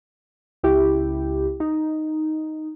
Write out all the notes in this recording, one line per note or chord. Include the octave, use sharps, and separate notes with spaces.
C#2 E4 G4
D#4